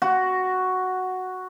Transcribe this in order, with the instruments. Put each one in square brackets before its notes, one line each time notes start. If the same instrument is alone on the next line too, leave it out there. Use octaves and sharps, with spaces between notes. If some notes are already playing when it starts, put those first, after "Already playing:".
[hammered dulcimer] F#4